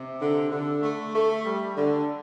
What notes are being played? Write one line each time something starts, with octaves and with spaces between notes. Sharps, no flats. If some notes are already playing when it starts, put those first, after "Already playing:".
Already playing: C3
D3
D3
A3
A3
G3
D3